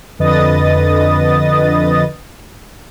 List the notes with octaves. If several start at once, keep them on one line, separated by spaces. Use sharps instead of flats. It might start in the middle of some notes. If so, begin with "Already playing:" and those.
F2 D3 B4 D#5 D#6 A6